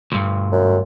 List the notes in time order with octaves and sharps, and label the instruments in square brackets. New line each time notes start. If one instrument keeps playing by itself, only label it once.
[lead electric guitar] D2 G2
[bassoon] F#2